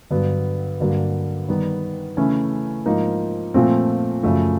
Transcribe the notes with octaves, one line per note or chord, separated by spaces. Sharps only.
G2 D3 F#3 B3
G2 D3 F#3 A#3
D#3 G3 B3
C#3 E3 A3 C#4 E4
G#2 F3 A#3 D#4
A#2 F3 A3 C4
F#2 C#3 F3 A3